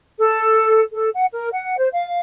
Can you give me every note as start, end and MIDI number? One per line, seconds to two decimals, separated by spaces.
0.17 0.82 69
0.93 1.09 69
1.15 1.26 78
1.33 1.48 70
1.52 1.76 78
1.78 1.89 72
1.92 2.21 77